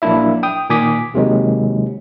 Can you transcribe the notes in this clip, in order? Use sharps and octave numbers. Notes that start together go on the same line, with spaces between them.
A#1 F#3 A#3 D4 E4 E5
G5 D#6
A#2 D#3 G#5 D6 D#6 B6
D#2 C3 D#3 F#3 G#3